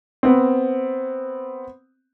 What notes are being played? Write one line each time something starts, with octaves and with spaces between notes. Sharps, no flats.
B3 C4